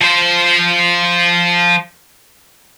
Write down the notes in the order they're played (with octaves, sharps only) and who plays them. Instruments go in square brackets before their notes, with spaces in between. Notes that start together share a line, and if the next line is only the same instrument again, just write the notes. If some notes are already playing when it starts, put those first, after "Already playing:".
[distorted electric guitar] F3 C5